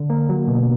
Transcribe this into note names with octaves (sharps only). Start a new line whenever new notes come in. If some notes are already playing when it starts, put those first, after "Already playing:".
Already playing: D3
A#3
F#3
B2